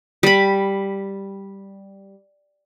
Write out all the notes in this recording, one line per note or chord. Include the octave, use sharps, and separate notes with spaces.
G3 B5